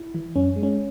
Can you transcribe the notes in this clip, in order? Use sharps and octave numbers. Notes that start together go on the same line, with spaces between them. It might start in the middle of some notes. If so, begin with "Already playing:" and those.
Already playing: E4
E3
F#2 C#4
G#3
C#4